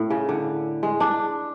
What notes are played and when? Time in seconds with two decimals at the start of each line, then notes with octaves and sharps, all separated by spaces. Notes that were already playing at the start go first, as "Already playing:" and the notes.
Already playing: A2
0.10 C#3
0.29 D3
0.83 G#3
1.00 D4